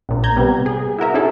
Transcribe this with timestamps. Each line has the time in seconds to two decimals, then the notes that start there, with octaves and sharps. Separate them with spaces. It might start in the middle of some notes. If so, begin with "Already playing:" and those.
0.09 A#1 A#2
0.24 A#5 G6 G#6
0.36 C3 G3 B3
0.66 G#4
0.98 E4 F#4 A#4 E5
1.14 C#4 D#4 E4 G#4 A4